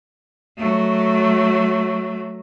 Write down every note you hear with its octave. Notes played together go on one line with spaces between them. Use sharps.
F#3 A3